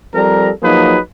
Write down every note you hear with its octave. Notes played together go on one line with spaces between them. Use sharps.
F3 G3 C4 A4 A#4 A#5
F3 F#3 A#3 D#4 G#4 B4